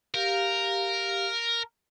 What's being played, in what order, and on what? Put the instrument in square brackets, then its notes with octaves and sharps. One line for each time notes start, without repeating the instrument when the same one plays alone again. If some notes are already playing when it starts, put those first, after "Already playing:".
[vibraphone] G4 F5 [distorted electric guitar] A#4